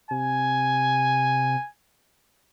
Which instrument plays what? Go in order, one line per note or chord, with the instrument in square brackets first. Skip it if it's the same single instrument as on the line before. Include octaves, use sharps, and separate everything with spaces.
[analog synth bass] C3 [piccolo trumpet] G#5